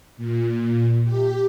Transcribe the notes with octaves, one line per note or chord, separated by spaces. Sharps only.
A#2
G4